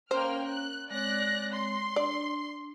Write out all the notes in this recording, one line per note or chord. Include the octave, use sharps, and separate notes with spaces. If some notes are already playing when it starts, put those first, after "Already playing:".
A#3 C#4 C5 C#5 G5 F6
F#6
G#3 C4 C#5 D5 F#6 A#6
C6
D4 D5